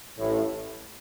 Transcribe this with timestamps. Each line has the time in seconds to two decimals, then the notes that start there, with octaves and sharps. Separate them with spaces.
0.18 A1 A2